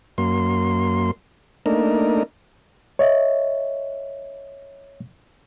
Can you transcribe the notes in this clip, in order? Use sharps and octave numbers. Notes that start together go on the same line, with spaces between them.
F#2 A#3 C6
A3 A#3 D4 D#4 A#4
C#5 D#5 E5